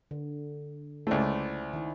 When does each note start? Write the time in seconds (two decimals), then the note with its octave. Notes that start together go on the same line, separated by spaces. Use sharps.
0.11 D3
1.07 C#2 A3 E4 C5 D5
1.73 D#3 E4